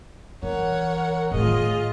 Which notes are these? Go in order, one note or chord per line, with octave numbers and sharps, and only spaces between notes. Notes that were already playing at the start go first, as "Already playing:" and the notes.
E3 A#4 C#5 F#5
A2 D#3 F4 G#4 D#5